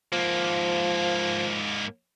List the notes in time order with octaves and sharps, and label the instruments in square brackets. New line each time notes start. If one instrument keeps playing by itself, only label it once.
[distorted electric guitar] G#2 A#3 [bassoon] F3